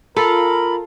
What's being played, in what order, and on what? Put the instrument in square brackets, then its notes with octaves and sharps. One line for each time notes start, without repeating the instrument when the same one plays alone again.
[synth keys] F4 [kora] A4 [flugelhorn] A#4 [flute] B5